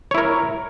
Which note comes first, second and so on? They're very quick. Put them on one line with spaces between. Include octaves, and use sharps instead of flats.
C#5 E4 A#4